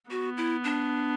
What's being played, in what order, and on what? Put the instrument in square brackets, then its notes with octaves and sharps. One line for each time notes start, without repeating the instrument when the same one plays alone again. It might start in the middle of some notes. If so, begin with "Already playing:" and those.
[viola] B3 [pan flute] F#4
[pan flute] E4
D4